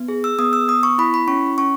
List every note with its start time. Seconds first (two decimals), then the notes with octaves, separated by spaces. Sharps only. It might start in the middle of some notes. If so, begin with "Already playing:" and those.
Already playing: B3
0.08 G#4
0.24 E6
0.39 B3 D#6
0.53 E6
0.68 B3 D#6
0.83 C#6
0.98 E4 B5
1.14 B5
1.28 C#4 C#6
1.58 C#4 C#6